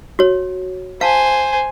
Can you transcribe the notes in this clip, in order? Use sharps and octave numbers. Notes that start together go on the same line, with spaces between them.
F#4 C#5
C5 F5 G#5 A5